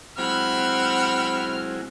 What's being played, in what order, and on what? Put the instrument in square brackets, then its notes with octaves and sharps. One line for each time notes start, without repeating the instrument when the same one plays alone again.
[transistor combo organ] F#3 G#3 E4 [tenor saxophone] C4 [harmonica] E5 F#5 B5 [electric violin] F6